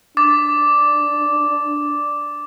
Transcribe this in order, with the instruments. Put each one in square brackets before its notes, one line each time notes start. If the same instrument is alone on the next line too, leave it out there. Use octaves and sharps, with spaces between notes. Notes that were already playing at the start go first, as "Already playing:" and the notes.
[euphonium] D4 [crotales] D6 A6